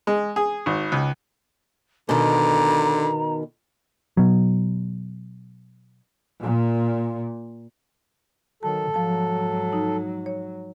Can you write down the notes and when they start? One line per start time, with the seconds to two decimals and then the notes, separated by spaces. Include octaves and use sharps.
0.07 G#3
0.36 G#4
0.66 G#1
0.92 C#2
2.09 B2 D3 D#3 A#5
4.17 B2 F#3
6.41 A#2
8.63 D#3 F#3 A4 A5
8.94 G#2 F3 F#3 A5
9.73 D#4
10.26 C#5